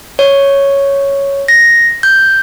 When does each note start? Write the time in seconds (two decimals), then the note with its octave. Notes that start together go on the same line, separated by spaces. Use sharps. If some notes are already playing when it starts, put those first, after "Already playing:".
0.19 C#5
1.48 A#6
2.03 G6